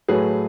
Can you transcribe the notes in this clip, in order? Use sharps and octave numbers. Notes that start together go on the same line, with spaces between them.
A2 F#3 A3 G#4 B4